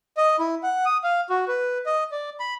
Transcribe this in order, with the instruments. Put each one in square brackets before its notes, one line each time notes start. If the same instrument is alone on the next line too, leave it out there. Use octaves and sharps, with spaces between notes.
[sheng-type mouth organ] D#5
E4
F#5
D#6
F5
F#4
B4
D#5
D5
B5